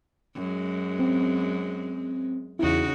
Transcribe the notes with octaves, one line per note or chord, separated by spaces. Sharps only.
F#2 G#3
C4
E2 C#3 D#4 E4 F#4